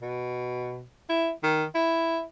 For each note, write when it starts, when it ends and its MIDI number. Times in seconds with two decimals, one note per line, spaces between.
0.02 0.84 47
1.09 1.31 64
1.43 1.65 51
1.75 2.22 64